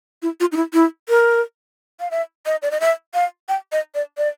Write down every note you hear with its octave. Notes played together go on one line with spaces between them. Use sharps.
E4
F4
D#4
E4
E4
A#4
F5
E5
D#5
D5
D#5
E5
F5
G5
D#5
D5
D5